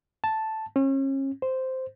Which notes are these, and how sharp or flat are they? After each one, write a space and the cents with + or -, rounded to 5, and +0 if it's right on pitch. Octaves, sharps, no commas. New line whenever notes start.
A5 +0
C#4 -35
C5 -5